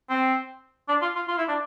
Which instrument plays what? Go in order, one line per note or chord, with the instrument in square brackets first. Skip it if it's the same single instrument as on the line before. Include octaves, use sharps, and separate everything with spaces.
[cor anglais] C4
D4
F4
F4
F4
E4
D4